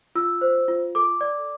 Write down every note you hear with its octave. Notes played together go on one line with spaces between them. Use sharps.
F4 E6
C5
F4
A4 D6
D5